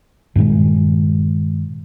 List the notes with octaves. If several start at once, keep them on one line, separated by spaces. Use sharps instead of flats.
G2 A#2 D#3 G#3